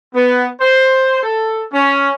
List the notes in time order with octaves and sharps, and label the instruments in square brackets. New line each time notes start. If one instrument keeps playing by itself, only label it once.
[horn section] B3
C5
A4
C#4